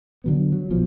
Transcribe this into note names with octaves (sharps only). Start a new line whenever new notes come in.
D3 F#3 B3
F#3
A#1 B2 F3